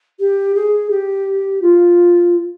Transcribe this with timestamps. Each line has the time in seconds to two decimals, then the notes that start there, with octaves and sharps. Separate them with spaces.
0.19 G4
0.55 G#4
0.90 G4
1.62 F4